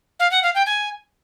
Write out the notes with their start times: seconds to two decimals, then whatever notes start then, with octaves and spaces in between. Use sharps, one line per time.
0.20 F5
0.31 F#5
0.43 F5
0.55 G5
0.66 G#5